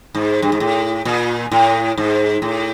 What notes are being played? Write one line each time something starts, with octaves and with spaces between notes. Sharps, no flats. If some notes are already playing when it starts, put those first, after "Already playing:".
G#2
G2
G#2
A2
A#2
A2
G#2
A2